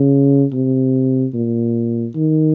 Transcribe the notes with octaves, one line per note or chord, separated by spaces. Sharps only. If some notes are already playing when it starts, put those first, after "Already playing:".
Already playing: C#3
C3
A#2
D#3